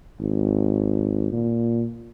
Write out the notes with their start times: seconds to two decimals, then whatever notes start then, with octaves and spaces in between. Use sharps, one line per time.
0.20 G#1
1.32 A#2